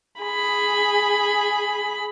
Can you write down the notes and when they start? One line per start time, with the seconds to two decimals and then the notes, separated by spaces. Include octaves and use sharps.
0.22 G#4 B5